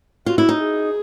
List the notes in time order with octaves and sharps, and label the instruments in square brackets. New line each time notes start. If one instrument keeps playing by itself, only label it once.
[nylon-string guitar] F4 [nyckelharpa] F#4
[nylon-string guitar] E4
D#4
[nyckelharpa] G#4